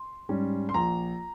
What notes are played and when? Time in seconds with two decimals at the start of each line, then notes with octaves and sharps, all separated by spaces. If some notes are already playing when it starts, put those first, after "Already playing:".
Already playing: C6
0.29 G#2 G3 C#4
0.69 C6
0.74 A#1 A#5